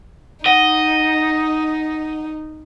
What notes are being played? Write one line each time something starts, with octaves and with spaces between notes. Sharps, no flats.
D#4 D#5 F#5